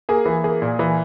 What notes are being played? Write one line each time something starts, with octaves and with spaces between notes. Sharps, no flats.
A#3 G#4
E3
A#3 G#4
A#2
E3